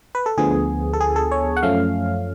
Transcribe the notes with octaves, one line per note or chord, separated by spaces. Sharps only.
B4
A4
D2 D3 F3 B3 G#4
A4
G#4
A4
C#5
F#5
F#2 F3 A3 C#4 F5